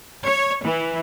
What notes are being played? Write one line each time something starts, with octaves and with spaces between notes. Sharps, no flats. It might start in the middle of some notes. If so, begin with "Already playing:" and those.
C#5
E3